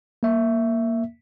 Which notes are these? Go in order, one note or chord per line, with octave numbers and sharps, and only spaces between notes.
A#3 E5